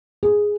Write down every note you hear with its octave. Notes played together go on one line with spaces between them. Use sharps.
G#4